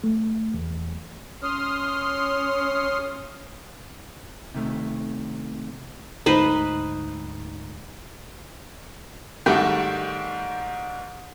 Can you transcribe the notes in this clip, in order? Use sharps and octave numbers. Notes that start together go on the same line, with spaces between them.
A3
E2
C#4 C6 D#6 F6
C3 D#3 A3
D2 G#2 D#4 B4 C5
G#2 D#3 G3 A3 F#4 G4